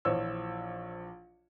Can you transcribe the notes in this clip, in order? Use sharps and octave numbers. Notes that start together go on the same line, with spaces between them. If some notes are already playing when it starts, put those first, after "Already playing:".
A#1 E3 F3 C#5 E6